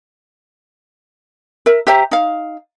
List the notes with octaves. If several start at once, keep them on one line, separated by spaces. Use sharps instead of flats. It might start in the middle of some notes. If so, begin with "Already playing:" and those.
A#4 E5
G4 C5 E5 A#5
D#4 F5